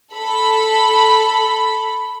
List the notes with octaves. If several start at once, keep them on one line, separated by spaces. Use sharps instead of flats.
A4 B5